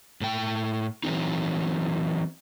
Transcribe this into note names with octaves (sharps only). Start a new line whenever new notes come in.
A2 G5
E3 F#3 C4 D#4